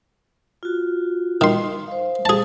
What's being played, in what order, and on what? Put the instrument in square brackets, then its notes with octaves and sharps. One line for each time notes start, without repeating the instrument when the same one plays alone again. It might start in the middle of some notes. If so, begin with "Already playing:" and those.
[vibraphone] F4 F#4
[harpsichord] D#3 C6
[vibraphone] C5 F5
[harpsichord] G#4 A5